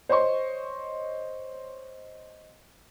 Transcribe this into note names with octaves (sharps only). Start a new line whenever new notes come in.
C5 C#5 D#5 C6 C#6